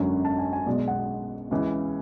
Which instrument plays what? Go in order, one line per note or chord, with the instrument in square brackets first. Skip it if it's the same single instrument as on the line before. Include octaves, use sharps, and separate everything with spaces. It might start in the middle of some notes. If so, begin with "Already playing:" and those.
Already playing: [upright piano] G#1 F#2 D3 F#3
A5
G#5
G#5
B1 B2 G#3 D5
F#5
C#2 C#3 E3